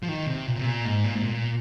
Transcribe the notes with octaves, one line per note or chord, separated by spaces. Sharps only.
F3
D#3
C3
A#2
C3
A#2
G#2
A#2
G#2
A#2